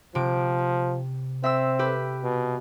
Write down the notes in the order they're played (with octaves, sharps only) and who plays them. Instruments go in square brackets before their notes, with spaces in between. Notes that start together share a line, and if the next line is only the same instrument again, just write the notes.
[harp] C3 D7 [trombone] F3
[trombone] C4 [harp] E5 E6
[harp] G4 B4
[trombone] B2